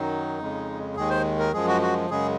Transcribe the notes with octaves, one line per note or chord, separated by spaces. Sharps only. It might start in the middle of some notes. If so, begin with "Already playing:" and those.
Already playing: F#2 D#3 F#3 D#4
F2 C#3 G#3
D#2 D#3 G#3 G#4
C5
A#4
F#2 F3 G#3 G#4
F#4
F#4
F#2 C#3 G#3 G#4